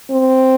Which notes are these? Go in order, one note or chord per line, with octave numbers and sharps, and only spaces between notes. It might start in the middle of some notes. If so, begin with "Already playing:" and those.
C4